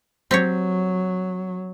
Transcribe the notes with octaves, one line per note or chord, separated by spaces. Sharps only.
F#3 C4 G4 C#5